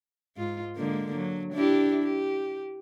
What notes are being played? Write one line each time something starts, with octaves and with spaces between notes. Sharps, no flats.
G#2 F4
D3 G#3 A#3
F#3
D4 E4 G4
G4